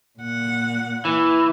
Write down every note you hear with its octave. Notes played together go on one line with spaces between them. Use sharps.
A#2 F#5
E3